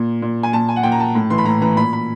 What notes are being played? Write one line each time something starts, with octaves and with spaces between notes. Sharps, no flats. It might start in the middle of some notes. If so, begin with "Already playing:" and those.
Already playing: A#2
A#2
G#5
A#2 A5
G#5
F#5
A#2 G5
A#5
A5
A2
E3 C6
B5
A2 A#5
E3 A#5
A#2 B5
B5